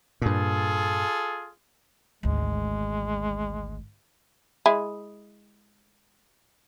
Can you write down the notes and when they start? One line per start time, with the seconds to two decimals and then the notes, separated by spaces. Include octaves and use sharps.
0.22 G2 A#2 F4 G#4 A4
2.23 G#1 D2 G#3
4.66 G#3 E4